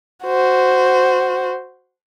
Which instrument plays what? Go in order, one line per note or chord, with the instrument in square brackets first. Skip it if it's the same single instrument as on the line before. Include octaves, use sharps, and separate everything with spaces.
[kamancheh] F#4 C5